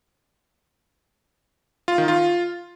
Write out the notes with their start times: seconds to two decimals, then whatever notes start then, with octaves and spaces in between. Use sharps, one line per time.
1.88 F4
1.98 D#3
2.08 F4